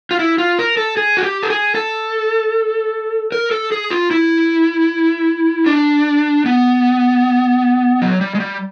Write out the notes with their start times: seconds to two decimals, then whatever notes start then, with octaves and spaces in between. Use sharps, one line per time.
0.11 F4
0.19 E4
0.38 F4
0.59 A#4
0.77 A4
0.97 G#4
1.17 F#4
1.24 G4
1.43 A4
1.50 G#4
1.75 A4
3.32 A#4
3.51 A4
3.72 G#4
3.90 F4
4.11 E4
5.66 D4
6.46 B3
8.02 F#3
8.21 G3
8.35 G#3
8.40 G3